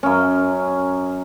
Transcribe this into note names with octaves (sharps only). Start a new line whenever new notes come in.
F#2 C#4